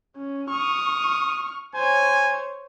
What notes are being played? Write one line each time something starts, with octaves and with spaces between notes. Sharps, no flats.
C#4
C#6 D#6 F6
C5 C#5 G#5